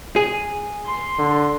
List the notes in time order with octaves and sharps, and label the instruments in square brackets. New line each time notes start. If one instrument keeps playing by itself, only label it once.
[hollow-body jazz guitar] G#4
[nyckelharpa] C6
[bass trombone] D3